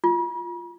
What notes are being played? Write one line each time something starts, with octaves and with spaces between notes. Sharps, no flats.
F4